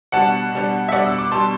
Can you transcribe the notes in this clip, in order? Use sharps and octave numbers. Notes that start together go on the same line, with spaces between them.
B2 G3 D4 F#5 A5
B2 G3 D4
E5
B2 G3 D4 D5 F#5
E6
D6
B2 G3 D4 A5 C6